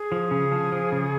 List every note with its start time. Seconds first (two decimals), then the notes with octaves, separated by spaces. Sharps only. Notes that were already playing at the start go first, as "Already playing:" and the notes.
Already playing: G#4
0.12 F3
0.31 C#3
0.52 F3
0.72 F3
0.92 C#3